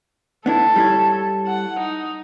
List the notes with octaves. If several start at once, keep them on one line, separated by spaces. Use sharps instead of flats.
B3 D4 E4 A4
G3 E4 C#5
F#5
D#4